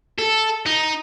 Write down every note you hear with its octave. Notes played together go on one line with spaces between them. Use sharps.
A4
D#4